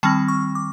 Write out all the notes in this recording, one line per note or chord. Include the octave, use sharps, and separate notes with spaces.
D#3 G3 C4 A5
C#6
D6